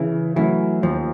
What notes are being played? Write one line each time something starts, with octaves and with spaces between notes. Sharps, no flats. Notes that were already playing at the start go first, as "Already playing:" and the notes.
Already playing: C#3 E3
E3 F#3 A3 C#4
D#2 F3